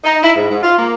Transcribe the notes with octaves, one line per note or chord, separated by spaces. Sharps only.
D#4
E4
G#2
G#2
F4
A#3